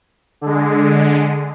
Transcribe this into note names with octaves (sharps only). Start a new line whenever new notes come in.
D3 G#3